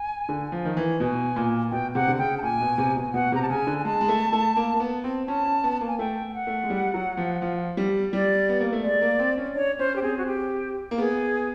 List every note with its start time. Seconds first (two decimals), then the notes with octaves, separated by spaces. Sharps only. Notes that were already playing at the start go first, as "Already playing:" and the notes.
Already playing: G#5
0.29 D3
0.52 F3
0.65 D#3
0.77 E3
1.00 B2 G#5
1.36 A#2
1.71 B2 G5
1.95 C3 F#5
2.08 D3
2.18 C#3 G5
2.38 A5
2.42 A#2 G#5
2.60 B2
2.78 C3
2.96 B2
3.14 B2 F#5
3.32 C3 A#5
3.42 A5
3.49 C#3 G#5
3.67 D3
3.79 G#5
3.85 G#3 A5
4.01 G#3
4.09 A3
4.33 A3
4.56 A#3
4.74 A#3
4.80 B3
5.04 C4
5.28 C#4 A5
5.45 C#4
5.64 B3
5.81 A#3
5.88 G#5
5.99 A3 G5
6.30 G5
6.34 F#5
6.47 A3
6.63 G#3
6.70 G3
6.94 F#3
7.17 F3
7.42 F3
7.77 G3
8.13 G3 D5
8.49 B3
8.60 A#3
8.73 A3
8.84 G#3 D5
9.01 A#3
9.19 C4
9.37 C#4
9.55 D4 C#5
9.79 C#4 C5
9.96 G4
10.02 C4 G#4
10.18 F#4
10.26 G4
10.91 A#3
10.98 B3 G#4